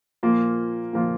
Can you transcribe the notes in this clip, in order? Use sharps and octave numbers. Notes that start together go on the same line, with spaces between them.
A#2 F3 A#3 F4
A#2 F3 A#3 F4